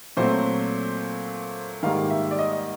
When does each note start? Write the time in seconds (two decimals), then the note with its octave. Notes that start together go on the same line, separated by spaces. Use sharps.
0.17 A#2 F#3 A3 C4 C5
1.83 G#2 D#3 G3 A#3 F5
2.10 E5
2.31 D5
2.39 D#5